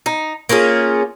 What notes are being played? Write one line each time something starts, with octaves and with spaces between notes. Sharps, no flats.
D#4
A#3 C#4 F4 G#4